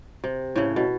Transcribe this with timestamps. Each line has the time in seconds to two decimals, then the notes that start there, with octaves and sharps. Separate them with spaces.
0.24 C3
0.56 A2 C#3
0.76 B2